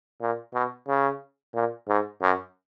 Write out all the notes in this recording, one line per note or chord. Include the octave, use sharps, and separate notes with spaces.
A#2
B2
C#3
A#2
G#2
F#2